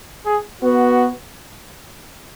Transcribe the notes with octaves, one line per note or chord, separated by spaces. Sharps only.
G#4
B3 F#4